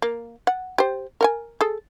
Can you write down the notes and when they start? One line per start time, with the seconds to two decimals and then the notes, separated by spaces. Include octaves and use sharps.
0.02 A#3
0.47 F#5
0.78 G4 C5
1.21 A#4 F#5 G#5
1.61 G#4 A4